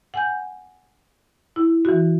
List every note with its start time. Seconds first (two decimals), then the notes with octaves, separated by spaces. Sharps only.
0.14 F#5 G#5 G6
1.56 E4
1.85 E3 F#4